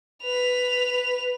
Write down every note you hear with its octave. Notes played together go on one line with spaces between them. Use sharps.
B4 F7